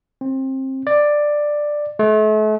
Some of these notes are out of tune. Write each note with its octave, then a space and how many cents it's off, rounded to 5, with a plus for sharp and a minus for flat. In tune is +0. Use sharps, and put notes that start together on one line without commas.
C4 +25
D5 +10
A3 -40